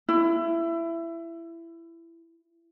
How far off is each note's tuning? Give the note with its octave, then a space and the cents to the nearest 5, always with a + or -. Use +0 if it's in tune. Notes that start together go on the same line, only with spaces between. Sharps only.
E4 +20